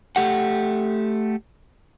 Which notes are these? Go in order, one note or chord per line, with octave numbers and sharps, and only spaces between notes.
A3 G4 F#5